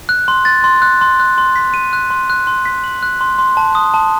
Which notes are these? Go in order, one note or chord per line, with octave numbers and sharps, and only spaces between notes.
F#6
C6
A6
C6
F#6
C6
F#6
C6
B6
D#7
F#6
C6
F#6
C6
B6
F#7
F#6
C6
C6
A5
D#6
A5